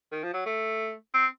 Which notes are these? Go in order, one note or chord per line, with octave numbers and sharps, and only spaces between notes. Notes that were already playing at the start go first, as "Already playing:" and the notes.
D#3
F3
F#3
A3
C4